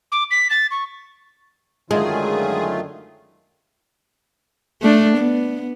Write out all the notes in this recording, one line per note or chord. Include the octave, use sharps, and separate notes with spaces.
D6
B6
A6
C#6
F#2 D3 D#3 F#3 G#3 A3 F4 G#4
A3 D4
B3